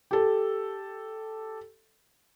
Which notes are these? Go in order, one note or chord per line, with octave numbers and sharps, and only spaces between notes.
G4 A4